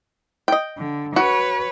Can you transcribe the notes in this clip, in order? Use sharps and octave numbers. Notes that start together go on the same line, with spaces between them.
D#5 G5
D3
F#4 B4 C#5